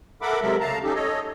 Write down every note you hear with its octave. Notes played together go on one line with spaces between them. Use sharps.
A4 A#4 E5 F#5 B5 D6
C3 F#3 G#3 A4 A#4 E5
C#3 A3 F5 A5 A#5
C#4 D#4 G4 A4
A4 C#5 D#5